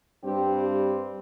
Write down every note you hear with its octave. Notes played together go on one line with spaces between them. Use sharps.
G2 G3 C4 G4
G4